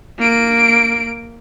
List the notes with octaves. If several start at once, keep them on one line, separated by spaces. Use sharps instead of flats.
A#3 D7